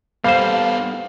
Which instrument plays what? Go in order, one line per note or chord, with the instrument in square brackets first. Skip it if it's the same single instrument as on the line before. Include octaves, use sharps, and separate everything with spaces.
[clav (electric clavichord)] G3 A#3 C5 [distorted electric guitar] B3 A4 [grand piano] F5